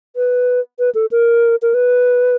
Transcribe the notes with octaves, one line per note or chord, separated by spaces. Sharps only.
B4
B4
A4
A#4
A#4
B4